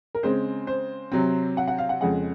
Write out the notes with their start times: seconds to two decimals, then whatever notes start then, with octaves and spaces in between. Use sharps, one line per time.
0.15 A#4
0.23 C#3 G#3 C4 C5
0.67 C5
1.12 C3 F#3 C4
1.57 F#5
1.68 F#5
1.78 F5
1.89 F#5
2.01 F2 C#3 G#3 F#5